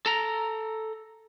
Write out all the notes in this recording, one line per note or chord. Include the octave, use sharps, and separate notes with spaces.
A4 A#5